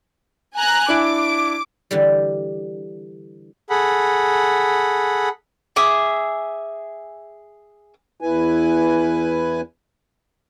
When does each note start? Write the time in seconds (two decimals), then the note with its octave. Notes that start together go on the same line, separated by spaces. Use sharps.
0.55 G#5 A#5 F#6
0.89 D4 E4 D6 D7
1.91 D3 E3 G3
3.70 G#4 A4 F#5 B5
5.76 G#4 E5 D6
8.21 E2 E4 B4 G#5